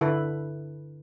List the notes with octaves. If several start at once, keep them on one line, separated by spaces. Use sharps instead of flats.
D3 E4 A4 B4